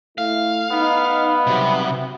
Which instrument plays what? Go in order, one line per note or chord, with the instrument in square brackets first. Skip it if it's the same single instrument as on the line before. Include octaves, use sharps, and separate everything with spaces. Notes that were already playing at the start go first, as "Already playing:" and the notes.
[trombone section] A3 E4 [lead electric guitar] F5
[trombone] B3 [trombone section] D#4
[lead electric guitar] C3 [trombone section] F#3 G3